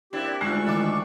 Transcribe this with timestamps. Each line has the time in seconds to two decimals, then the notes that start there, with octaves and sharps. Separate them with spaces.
0.13 A#3 C4 D4 E4 G4
0.41 D2 G2 D3 G#3 A3 F4 C#6 F#6
0.66 D#3 E3 A4 D6